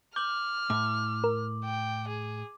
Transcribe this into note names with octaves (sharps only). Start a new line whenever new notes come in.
D6 F6 G6 F#7
A2 D6
A#4
G5
G#4